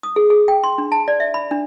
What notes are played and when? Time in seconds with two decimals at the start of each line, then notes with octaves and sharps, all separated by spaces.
0.03 D#6
0.16 G#4
0.30 G#4
0.48 G5
0.64 C6
0.78 D4
0.92 A5
1.08 D5
1.20 E5
1.34 B5
1.51 D4